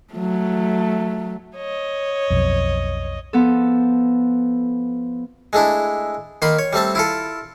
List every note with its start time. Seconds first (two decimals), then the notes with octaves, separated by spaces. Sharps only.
0.14 F#3 A3
1.57 C#5 D#5
2.30 B1 F2
3.33 F3 B3 A4
5.53 G#3 A3 D4 E4
6.42 D#3 A#3 B5 C6
6.59 C#5
6.73 G3 A3 C4 A5
6.95 E4 F4 A4